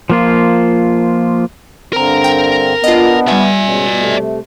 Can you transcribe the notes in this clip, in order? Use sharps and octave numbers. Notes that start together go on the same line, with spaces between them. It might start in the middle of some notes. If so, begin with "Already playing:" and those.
F3 A#3 F4
G2 D3 C4 A#4 A#5
G5
B3 D4 F4 D#5
G3 D5 E5 G#5
B2 G#3 C#4
C3 A3